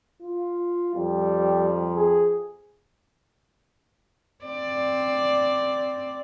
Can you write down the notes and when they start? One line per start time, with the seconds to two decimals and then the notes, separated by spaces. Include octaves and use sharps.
0.22 F4
0.96 F2 G3
1.96 G#4
4.45 C4 D5